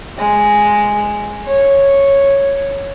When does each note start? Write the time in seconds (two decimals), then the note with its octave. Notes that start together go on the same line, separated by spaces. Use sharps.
0.18 G#3
1.46 C#5